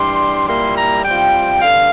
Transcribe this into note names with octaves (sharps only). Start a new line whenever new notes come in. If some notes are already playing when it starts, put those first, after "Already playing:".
Already playing: E3 G3 D4 C6
A#2 G3 A#3 E4 C6
A#5
C3 G3 C4 F4 G5
G2 D3 F5